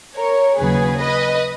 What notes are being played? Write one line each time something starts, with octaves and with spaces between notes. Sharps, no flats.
A#4 C#5
D#2 C#3 F#3 G#4 B4
B4 D#5